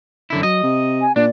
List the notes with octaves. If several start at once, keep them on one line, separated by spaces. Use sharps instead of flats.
F#2 D3 E4
F#3 D#5
C3
G#5
A#2 D4 D5